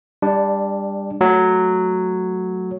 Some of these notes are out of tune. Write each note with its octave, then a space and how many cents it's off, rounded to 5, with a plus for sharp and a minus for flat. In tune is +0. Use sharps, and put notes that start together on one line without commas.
G3 +25 D4 +0
F#3 +0 A3 +0